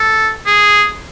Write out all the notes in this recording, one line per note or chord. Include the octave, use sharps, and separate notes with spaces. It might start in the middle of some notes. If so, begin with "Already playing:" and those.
Already playing: A4
G#4